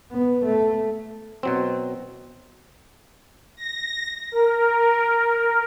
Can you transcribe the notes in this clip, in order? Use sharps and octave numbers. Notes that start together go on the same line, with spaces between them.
B3
A3
B2 F#3 C4
A#6
A#4